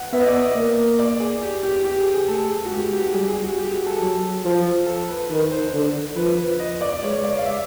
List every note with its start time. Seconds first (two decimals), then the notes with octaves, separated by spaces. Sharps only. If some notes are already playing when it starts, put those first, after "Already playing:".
Already playing: F#5
0.13 B3 E5
0.20 D#5
0.27 D5
0.41 D#5
0.56 A#3
0.99 D5
1.20 G#4
1.42 G4
1.63 G4
1.84 G4
2.00 G#4
2.14 G#4
2.28 A3 A4
2.50 G#4
2.65 F#4
2.71 G#3 G4
2.93 G4
3.14 G3 G#4
3.28 G#4
3.43 F#4
3.58 G4
3.71 G#4
3.87 A4
4.01 F#3
4.44 F3
4.86 A4
5.08 B4
5.30 D#3 B4
5.52 C5
5.73 D3
6.16 F3 B4
6.38 B4
6.59 D#5
6.81 D5
7.03 G#3 C#5
7.24 D5
7.38 F5
7.46 E5